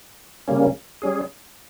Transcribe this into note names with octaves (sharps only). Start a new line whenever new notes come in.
C#3 G3 A#3 C#4
G3 C#4 G#4